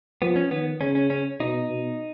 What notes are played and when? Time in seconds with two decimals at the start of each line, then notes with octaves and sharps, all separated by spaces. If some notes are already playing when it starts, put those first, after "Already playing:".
0.22 F3 B3
0.36 C#4
0.51 D#3 B3
0.81 C#3 C#4
0.95 C#4
1.10 C#4
1.40 B2 D#4
1.69 B2